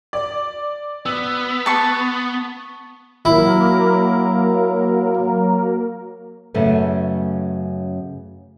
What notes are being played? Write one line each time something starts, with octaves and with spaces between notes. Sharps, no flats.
D5
B3 E6
A5 C#6
F#3 A#3 E4 A#4
F#2 C#3 A3 B3